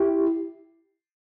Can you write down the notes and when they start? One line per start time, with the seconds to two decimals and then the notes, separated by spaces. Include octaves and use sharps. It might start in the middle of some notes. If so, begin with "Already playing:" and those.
Already playing: E4 G4